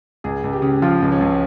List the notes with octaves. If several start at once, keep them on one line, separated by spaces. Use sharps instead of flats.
C#2 G#4
C#2
G4
C#3
F3 F4
C#2
C#4
C#2